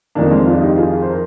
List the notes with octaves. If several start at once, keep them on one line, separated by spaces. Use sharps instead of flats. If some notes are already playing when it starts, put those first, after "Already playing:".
F2 D#3 A#3 D4
G#3 C4
D4 F4
D#4 G4
F4 G#4
C5
A#4